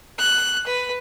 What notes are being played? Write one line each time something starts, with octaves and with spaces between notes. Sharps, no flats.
F#6
B4